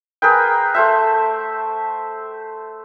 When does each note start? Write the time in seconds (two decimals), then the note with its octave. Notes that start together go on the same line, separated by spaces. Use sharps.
0.22 G#4 A#4 B4 G5
0.74 A3 C5 E5